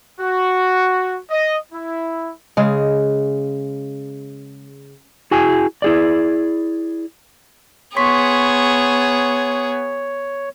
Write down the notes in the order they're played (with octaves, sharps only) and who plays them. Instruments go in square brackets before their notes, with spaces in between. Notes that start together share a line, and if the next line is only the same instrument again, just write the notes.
[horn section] F#4
D#5
E4
[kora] C#3 G#3
[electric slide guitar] E4 F#4 G#4 G#5
E4 G#4 D5
[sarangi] B3 [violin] G#4 [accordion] C#5 [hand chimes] C6 C#6 B6